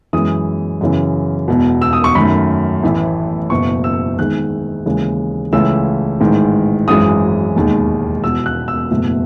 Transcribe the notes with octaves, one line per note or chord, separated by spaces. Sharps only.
F#2 E3 G#3 D#6
F#2 C#3 E3
E1 E2 B2
E6
D#6
C#6
F#2 D#3 A3 B5
A1 A2 E3 A3
F#1 E2 B2 C#6
E6
E2 D#3 G#3 F#6
D#2 C#3 E3 G#3
C#2 C#3 E3 A3 E6
A1 G#2 D#3 G#3
G#1 F#2 E3 G#3 D#6
E1 D#2 D#3 G#3
E1 E2 B2 E6
F#6
E6
F#1 E2 B2 A3